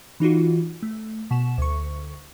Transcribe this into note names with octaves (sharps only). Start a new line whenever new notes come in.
E3 D#4 F4 F#4
A3
B2 E7
D2 C#6